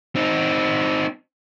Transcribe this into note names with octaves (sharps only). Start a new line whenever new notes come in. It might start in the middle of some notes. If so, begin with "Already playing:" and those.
C4 D#4